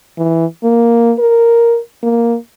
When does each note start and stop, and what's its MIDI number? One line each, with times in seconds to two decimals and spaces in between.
0.18 0.45 52
0.63 1.13 58
1.19 1.79 70
2.03 2.36 58